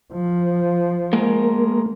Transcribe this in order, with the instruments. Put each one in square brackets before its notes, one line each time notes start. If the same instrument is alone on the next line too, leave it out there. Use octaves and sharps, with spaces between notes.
[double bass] F3
[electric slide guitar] G#3 A#4 [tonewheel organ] A#3